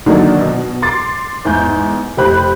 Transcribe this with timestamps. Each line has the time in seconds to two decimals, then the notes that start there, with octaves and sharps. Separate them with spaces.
0.06 D3 D#3 F#3 A#3 D4 D#4
0.41 B2
0.82 C6 D6 A6
1.45 E2 G#2 G6
2.17 F1 G4 C5 B5 F#6